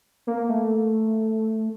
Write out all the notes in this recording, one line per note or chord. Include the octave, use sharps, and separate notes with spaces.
A#3
A3